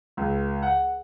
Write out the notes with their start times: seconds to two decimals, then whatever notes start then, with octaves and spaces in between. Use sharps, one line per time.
0.17 C#2
0.63 F#5